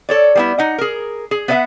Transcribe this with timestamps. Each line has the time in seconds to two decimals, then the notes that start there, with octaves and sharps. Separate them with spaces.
0.09 A4 C#5 D5
0.35 G3 B3 E4
0.59 D#4 F#5
0.78 G#4 A#4
1.31 G#4
1.48 B3 B4 C#5 D#5 E5 F#5